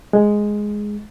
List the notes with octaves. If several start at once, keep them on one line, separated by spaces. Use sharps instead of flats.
G#3